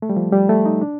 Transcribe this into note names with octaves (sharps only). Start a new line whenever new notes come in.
A3
G3
F3
G3
A3
D#4
D4